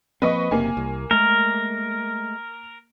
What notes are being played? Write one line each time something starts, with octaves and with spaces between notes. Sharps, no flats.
F3 A#3 C4 B4 D#5 C#6
F#1 C3 A#3 G#5
C2
G#3 A3 A#4